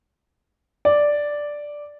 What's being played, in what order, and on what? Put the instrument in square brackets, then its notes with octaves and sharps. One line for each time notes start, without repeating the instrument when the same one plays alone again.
[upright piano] D5